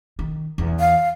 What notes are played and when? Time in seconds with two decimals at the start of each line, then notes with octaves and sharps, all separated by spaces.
0.19 D#3
0.58 E2
0.80 F5